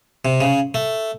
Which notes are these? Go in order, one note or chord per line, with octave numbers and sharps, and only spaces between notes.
C3
C#3
A3